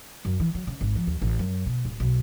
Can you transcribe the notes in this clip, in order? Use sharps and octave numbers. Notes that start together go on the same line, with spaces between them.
F#2
E3
F#3
C#3
G#1
F3
D#2
A1
F#2
B2
D1
B1